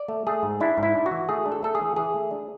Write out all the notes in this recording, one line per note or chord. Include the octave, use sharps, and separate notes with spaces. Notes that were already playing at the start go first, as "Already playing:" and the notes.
Already playing: D5
A3
A3 G#4
G#2
D4 E4
G#2
E4
D4
F#4
E3
A3 G#4
D4
A4
A3 A4
G#4
E3
E3 G#4
A3
D4